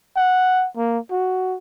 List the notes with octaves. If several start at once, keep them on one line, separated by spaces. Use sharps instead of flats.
F#5
A#3
F#4